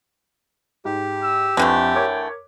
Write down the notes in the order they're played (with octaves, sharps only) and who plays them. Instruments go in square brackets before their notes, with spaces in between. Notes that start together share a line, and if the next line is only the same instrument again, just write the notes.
[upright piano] G#2 [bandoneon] G4
[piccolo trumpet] E6
[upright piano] F2 [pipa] D3 E3 A3 [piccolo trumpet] G5
[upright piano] A#4 C#5 D6